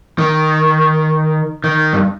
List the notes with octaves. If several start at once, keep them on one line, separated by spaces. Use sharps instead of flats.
D#3
D#3
G2